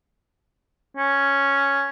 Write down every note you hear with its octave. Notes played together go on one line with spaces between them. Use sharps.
C#4